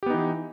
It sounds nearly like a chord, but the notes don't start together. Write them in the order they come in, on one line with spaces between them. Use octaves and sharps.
G4 B3 D#4 E3